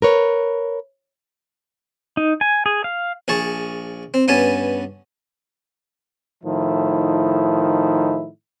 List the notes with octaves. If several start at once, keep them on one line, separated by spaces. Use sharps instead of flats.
A#4 B4 C#5
D#4
G#5
G#4
F5
A#1 G#4 A5 C#6
C4
G2 B3 C#4 G#5 A5
A2 D#3 F3 D#4 E4